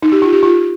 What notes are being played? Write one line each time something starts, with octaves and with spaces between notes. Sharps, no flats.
D#4
G4
F4
G4
F4